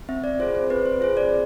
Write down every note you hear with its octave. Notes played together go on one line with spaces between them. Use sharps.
C4 E5
D5
F4 G#4 C5
C5
C4 B4
C5
F4 G#4 C5
D5